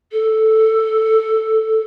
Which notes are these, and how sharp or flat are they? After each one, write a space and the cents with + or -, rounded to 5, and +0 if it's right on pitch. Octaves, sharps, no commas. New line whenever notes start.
A4 +5